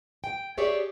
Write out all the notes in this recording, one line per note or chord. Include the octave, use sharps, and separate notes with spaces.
G5
G4 G#4 C#5 D5 E5